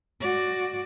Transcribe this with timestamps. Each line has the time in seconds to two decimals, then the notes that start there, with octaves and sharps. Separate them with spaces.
0.21 F#4 D5